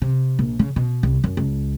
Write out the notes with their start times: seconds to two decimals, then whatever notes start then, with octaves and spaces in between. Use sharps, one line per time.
0.02 C3
0.39 A#1
0.59 C#3
0.76 B2
1.03 C2
1.24 F#2
1.37 C#2